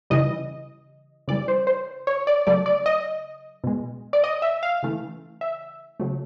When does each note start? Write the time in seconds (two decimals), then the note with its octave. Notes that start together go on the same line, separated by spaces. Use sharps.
0.10 C#3 E3 G3 D#5
1.28 C#3 E3 G3 D5
1.48 C5
1.67 C5
2.07 C#5
2.27 D5
2.47 C#3 F#3 A3 D5
2.66 D5
2.86 D#5
3.64 B2 G#3
4.13 D5
4.24 D#5
4.42 E5
4.63 F5
4.83 C#3 E3 A3
5.41 E5
6.00 C#3 F#3 A3